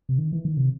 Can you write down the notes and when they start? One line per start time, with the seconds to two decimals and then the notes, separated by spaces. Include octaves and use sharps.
0.09 C3
0.18 D#3
0.32 E3
0.45 D#3
0.57 C3